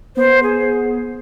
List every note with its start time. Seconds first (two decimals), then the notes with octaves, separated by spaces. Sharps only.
0.17 B3 C5
0.43 G#4